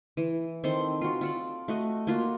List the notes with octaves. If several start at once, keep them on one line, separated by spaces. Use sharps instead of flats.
E3
D#3 C4 A4 C6
F4 F#4
F4 A4 D5
A3 F#4 D#5
A#3 F4 F#4